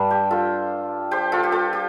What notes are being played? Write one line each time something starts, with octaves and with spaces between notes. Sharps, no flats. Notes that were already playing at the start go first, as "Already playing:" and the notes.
Already playing: G2 G3 D4
G4
F4 A4
G4 C5
F4 A4
G4
F4 A4
G4